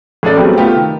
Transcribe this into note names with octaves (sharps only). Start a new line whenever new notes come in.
A1 G#4 A4 D5
F#3 G3 A3 B3 C4
A3 B3 F4 G4
D#3